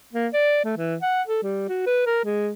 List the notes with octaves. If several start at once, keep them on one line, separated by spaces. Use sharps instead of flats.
A#3
D5
A3
E3
F#5
A4
G3
F#4
B4
A#4
G#3